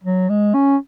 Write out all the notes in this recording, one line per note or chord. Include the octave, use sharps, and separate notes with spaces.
F#3
G#3
C#4